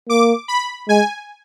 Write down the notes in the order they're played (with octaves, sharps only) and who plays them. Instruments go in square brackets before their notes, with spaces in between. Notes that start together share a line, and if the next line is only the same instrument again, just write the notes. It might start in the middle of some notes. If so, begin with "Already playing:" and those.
[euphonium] A#3 [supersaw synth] D6
[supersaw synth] B5
[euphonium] G#3 [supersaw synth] G#5